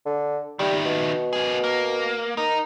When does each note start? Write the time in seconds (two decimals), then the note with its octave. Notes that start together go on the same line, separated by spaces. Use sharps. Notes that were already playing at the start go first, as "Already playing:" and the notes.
0.06 D3
0.59 D#3 G3 E4
0.85 B2
1.33 A#3 G#4
1.64 A#3
2.37 D#4 A#4